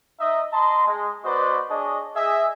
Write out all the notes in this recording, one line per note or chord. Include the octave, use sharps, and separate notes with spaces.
D#4 D#5 E5
D#5 A5 A#5 C6
G#3
B3 F#4 B4 C5 D5 D#5
D4 G#4 C#5 D#5
G#4 D#5 E5